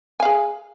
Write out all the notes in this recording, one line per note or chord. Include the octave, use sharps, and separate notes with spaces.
G#4 F5 G#5